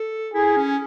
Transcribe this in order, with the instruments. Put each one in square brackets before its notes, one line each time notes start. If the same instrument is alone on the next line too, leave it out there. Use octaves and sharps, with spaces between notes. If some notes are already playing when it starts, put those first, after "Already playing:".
Already playing: [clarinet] A4
[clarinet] E4 [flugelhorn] G#4
[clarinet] C#4